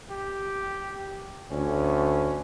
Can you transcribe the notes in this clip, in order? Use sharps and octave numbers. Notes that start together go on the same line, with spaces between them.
G4
D2 C#4